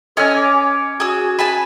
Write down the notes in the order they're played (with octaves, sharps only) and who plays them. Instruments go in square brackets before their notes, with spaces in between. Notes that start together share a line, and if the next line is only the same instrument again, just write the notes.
[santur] C#4 C#5 [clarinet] A4 [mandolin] D#5 G#5 F6
[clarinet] D6
[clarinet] F#4 [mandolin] G#4 E6
[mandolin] B4 G#5 A5 [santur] B5